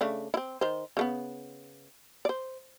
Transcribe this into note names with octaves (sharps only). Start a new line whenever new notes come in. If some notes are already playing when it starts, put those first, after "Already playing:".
C#3 A3 D4
C4 E4
D#3 C5
C#3 A3 B3
C5 D5